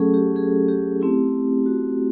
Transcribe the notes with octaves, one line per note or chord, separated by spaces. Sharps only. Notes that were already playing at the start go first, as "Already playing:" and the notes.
Already playing: F#3 A3 C#4 G#4 A4
G4
G#4
G4
A3 C4 E4 G4
F#4